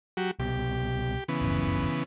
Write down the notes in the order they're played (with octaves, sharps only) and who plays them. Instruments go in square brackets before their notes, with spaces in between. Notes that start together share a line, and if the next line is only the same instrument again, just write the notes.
[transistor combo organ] F#3 F#4 G4
[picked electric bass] C2 B2 [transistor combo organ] G4
[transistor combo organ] C#3 E3 B3
[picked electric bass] D1 G1 F#2